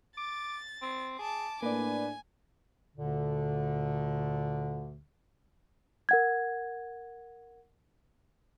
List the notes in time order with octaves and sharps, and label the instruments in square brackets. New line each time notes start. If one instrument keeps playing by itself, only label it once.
[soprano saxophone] D6 [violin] A6
[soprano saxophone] C4
[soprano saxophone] G#4 [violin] A5 D6
[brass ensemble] A2 D4 [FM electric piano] A#3 D5 [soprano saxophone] B4 [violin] G#5
[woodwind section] D2 A#2 D3
[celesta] A#4 F#5 G#6